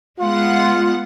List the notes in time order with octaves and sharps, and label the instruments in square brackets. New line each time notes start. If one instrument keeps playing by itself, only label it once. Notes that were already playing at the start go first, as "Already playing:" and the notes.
[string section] G#3 B3 F#5 [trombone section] F4